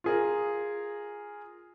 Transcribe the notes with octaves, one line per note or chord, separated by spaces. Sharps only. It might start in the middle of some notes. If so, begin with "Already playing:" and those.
F4 G#4 A#4